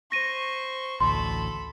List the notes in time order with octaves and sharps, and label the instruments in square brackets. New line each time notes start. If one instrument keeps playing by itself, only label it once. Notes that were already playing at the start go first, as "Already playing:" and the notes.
[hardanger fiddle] C5 C#6 [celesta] A#6 D#7
[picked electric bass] A1 D2 [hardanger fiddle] A4 B5 [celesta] C6